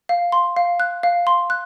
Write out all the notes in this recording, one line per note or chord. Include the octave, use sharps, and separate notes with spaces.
F5
C6
F5
F#6
F5
C6
F#6